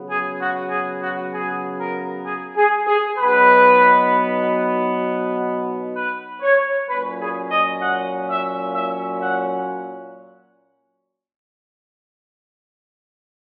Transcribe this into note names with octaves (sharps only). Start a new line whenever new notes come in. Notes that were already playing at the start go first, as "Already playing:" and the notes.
Already playing: C#3 F#3 B3
G#4
F#4
G#4
F#4
G#4
A#4
G#4
G#4
G#4
B2 F#3 B3 D#4 B4
B4
C#5
A#2 F#3 C#4 B4
G#4
D#5
F#5
E5
E5
F#5